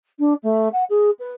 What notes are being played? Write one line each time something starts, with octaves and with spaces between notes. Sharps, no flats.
D4
A3
F#5
G#4
B4